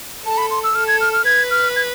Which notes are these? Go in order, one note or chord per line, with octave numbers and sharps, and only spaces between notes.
A4 A5
B5
C6
E6
A4 F6
G#6
F6
F6
B4 G#6
F6
G#6